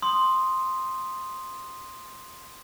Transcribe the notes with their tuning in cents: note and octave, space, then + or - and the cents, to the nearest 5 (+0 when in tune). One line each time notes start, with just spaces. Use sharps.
C6 +0 D#6 -10